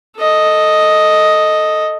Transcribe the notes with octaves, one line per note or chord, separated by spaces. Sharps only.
A4 D#5